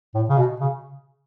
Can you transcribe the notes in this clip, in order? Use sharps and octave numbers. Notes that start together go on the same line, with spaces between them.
A2
C#3
B2
C#3